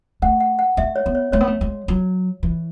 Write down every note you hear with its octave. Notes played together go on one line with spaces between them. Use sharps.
A3 F#5
F#5
F#5
A3 E5
C#5
B3
C#5
A3 C#5
B3
A3
G#3
F#3
E3